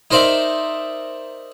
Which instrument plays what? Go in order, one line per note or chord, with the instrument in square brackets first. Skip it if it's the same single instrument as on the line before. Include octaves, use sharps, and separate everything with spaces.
[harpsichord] D#4 A#4 C5 D5 E5